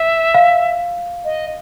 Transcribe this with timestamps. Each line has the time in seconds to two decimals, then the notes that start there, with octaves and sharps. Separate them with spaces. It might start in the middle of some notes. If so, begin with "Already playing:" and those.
Already playing: E5
0.34 F5
1.25 D#5